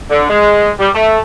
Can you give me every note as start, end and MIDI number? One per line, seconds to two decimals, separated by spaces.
0.10 0.28 50
0.30 0.70 56
0.79 0.89 55
0.95 1.19 57